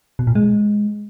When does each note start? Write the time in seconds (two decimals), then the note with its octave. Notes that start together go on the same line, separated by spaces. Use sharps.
0.19 B2
0.27 A#2
0.35 G#3